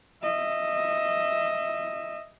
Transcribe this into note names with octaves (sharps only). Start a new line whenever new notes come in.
D#5 E5